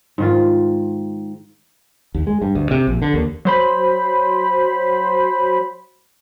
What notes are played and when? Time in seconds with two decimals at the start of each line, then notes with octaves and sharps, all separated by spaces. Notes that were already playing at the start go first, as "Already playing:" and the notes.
0.18 G#2 D#3 F4
2.14 D#2
2.27 G#3
2.42 G2
2.55 D2
2.71 C3
2.87 A#1
3.02 D3
3.14 D#2
3.45 F#3 C5 B5